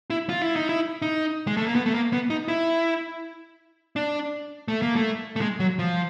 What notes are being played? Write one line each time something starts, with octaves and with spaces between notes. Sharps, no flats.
E4
F4
E4
D#4
E4
D#4
G#3
A3
A#3
B3
A3
A#3
B3
D#4
E4
D4
A3
A#3
A3
A3
G#3
F#3
F3